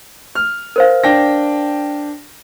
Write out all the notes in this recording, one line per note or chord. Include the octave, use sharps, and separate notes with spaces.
F6
A#4 C5 F5
D4 G5 A#6